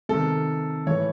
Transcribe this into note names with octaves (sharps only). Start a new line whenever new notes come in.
C3 D#3 A4
A2 E3 C#5